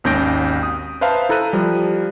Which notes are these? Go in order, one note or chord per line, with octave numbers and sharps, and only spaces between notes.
G#1 D#2 C#4 G6 A#6 D7
D#6
B4 C5 E5 F5 A5 A#5
E4 A4 A#5 F#6 D#7
F3 G3